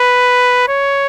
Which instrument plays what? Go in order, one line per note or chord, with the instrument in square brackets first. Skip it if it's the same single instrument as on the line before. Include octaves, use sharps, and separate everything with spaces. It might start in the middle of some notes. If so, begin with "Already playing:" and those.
Already playing: [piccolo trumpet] B4
C#5